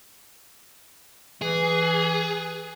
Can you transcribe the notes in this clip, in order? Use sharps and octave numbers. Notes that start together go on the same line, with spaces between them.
E3 G#4